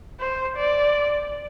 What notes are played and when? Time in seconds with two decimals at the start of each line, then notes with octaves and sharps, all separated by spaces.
0.20 C5
0.57 D5